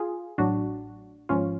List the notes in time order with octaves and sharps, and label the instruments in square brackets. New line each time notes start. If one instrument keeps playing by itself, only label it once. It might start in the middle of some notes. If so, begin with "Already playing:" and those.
Already playing: [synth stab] F4 G#4
A1 A2 F#3 D4 F#4
G#1 G#2 F3 C#4 F4